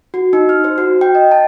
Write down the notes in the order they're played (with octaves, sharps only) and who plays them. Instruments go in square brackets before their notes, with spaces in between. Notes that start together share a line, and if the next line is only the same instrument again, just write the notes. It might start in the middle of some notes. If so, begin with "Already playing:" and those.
[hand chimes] F#4
D#4
F6
C5
F#4
G5
D#5
A5